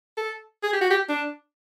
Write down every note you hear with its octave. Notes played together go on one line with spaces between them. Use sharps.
A4
G#4
G4
F#4
G4
D4